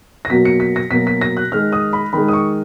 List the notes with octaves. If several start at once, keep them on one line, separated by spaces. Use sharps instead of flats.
A#6
B2 F#3 A#3 B6
C#7
B6
A#6
B2 F#3 A#3 B6
B6
A#6
F#6
D#3 G#3 F6
D#6
B5
D#3 G#3 B5
D#6
C#6